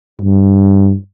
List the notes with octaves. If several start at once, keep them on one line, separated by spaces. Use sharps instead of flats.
G2